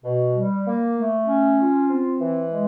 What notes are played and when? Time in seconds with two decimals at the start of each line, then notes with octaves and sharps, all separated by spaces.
0.03 B2
0.35 G3
0.66 A#3
0.97 A3
1.27 C#4
1.58 F4
1.90 C4
2.20 E3
2.51 G#3